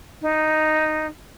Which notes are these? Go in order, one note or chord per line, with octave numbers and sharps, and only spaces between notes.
D#4